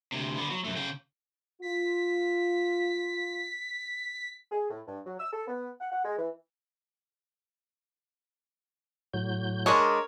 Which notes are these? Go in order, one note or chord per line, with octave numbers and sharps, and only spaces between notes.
D2 C3
D3 B3
F#3
F#2 A3
C#3 G5
F4 B6
G#4
A2
G2
F#3
E6
A4
B3
F#5
F#5
G#3
E3
A2 F#3 G6
G#3 D4 A#4 C#5 D#5 C#6